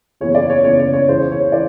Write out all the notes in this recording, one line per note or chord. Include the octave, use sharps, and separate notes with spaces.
F#1 E2 C#3 E3 C#5
D5
C#5
F#1 E2 C#3 E3 C#5
C#5
C#5
C#2 C#3 E3 C5
C#5
E3 D5